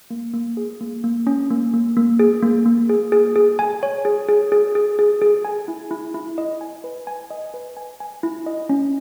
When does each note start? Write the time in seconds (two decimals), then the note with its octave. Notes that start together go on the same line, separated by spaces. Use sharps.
0.10 A#3
0.34 A#3
0.57 G#4
0.81 A#3
1.04 A#3
1.27 C#4
1.51 A#3
1.74 A#3
1.97 A#3
2.19 G#4
2.42 A#3
2.66 A#3
2.90 G#4
3.12 G#4
3.36 G#4
3.59 G#5
3.83 C#5
4.05 G#4
4.29 G#4
4.52 G#4
4.75 G#4
4.99 G#4
5.22 G#4
5.45 G#5
5.68 E4
5.91 E4
6.14 E4
6.38 D#5
6.61 G#5
6.84 B4
7.07 G#5
7.31 D#5
7.54 B4
7.77 G#5
8.00 G#5
8.23 E4
8.46 D#5
8.69 C#4